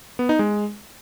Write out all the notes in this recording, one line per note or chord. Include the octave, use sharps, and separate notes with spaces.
B3
D#4
G#3